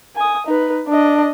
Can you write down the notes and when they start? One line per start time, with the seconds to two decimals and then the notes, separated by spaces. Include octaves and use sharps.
0.16 G#5 D#6
0.47 D#4 B4
0.88 D4 D#5